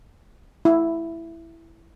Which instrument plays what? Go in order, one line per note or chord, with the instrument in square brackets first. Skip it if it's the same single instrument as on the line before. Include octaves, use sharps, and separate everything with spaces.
[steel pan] E4